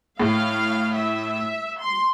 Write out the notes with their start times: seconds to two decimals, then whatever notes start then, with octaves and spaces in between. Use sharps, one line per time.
0.20 A2 F5
0.95 E5
1.80 C6